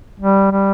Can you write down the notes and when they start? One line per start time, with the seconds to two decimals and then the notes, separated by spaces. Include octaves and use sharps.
0.20 G3
0.51 G3